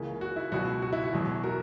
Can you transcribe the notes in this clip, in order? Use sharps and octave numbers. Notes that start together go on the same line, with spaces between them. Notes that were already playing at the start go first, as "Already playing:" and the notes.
Already playing: C#2 C#3 E3 A#3
F#4
E4
C#2 B2 F#3 F#4
F#4
E4
F#4
E2 B2 F#3
F#4 A#4